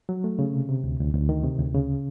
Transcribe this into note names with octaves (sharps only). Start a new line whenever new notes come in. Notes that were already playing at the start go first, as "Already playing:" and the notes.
F#3
A3
C#3
C3
C3
D2
D2
D2
D#3
C3
D2
C#3